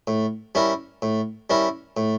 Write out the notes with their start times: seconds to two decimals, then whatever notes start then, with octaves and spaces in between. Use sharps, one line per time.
0.07 A2
0.55 G3 C#4 E4 A#4
1.02 A2
1.50 G3 C#4 E4 A#4
1.97 A2